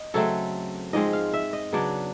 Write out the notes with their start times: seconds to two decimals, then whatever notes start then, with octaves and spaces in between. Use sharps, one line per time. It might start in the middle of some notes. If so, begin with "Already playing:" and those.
Already playing: D#5
0.14 C#3 F#3 A3 C4 A4
0.93 G#2 F3 G#3 C4 D#5
1.13 F5
1.33 E5
1.53 D#5
1.72 C#3 F#3 B3 D4 D5